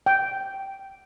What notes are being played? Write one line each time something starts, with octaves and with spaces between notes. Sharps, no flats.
G5